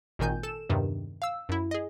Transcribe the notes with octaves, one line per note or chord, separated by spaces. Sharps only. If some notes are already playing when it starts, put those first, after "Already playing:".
G#1 A#2 D#3 G#5 G6
A4 E7
E2 G2 C3 D#3
F5 E6
F#2 E4
G#4 D#5